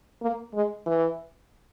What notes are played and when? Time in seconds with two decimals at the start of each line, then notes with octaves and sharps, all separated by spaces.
0.22 A#3
0.54 G#3
0.86 E3